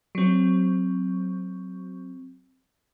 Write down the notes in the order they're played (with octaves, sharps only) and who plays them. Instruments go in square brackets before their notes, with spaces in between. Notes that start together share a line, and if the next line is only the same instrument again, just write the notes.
[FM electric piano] F#3 C4